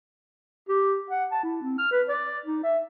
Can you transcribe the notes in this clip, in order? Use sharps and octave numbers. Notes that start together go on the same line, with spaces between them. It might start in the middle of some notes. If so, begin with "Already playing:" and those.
G4
F#5
A5
E4
C4
F6
B4
D5
D#4
E5